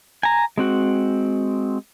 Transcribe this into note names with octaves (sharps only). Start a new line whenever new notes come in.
G#5 A#5
G#3 C4 F#4